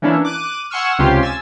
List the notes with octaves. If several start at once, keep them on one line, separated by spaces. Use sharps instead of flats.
E3 A#3 C#4 D4 E4
D6 F#6 D#7
F#5 G#5 C6 C#6 E6 F6
C#2 C3 C#4 F4 G4 C6
G#5 E6 A6